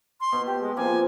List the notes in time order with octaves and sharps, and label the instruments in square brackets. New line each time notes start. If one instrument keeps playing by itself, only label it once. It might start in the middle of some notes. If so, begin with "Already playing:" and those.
[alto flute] C6
[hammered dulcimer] B2 A5
[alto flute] G4
G#3
[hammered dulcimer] F3 A#3 C4 [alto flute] G#5